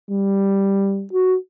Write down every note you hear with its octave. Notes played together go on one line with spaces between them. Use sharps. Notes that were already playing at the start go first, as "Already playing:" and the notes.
G3
F#4